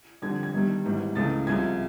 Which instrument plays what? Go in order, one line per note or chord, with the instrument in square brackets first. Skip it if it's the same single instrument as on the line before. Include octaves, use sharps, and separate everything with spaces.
[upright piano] F2 D3 G3 G#6
G#6
G1 G2 D#3 G3
G#1 G#2 E3 G3
C#2 C#3 E3 A3 A6
C2 C3 F3 G#3 G#6